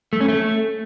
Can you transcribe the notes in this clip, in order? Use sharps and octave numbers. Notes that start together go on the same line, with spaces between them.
A3
C#4
A3